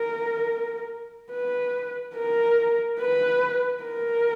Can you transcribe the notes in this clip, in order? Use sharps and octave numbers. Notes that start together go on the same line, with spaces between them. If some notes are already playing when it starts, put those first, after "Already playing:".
Already playing: A#4
B4
A#4
B4
A#4